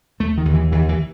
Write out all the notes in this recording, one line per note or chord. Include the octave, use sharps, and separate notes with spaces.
D#2 A3
D#3
D#2
E3
D#2 E3
E3